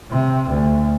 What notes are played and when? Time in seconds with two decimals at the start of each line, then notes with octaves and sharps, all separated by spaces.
0.11 C3
0.50 D2